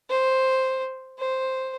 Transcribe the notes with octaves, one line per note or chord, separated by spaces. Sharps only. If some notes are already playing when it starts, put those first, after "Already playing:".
C5
C5